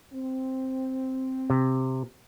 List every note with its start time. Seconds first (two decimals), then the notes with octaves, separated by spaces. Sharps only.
0.14 C4
1.50 C3